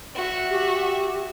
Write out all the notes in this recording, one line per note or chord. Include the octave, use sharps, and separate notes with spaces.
F#4 E5
G4